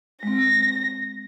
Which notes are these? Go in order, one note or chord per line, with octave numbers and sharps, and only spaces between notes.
G#3 C4 A#6